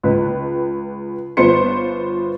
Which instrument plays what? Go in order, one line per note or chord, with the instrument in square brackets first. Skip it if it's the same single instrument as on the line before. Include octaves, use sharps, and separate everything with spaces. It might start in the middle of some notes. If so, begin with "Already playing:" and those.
[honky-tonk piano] C#2 B4
G1 B3 F4 C5 C#7